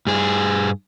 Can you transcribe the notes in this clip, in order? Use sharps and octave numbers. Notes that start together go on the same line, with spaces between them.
G2 G#4